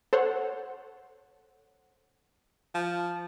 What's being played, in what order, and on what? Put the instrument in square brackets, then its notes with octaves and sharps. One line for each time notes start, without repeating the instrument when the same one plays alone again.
[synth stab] A4 C5 C#5 F#5
[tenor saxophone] F3